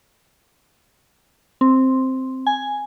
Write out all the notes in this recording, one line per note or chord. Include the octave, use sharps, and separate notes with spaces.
C4
G#5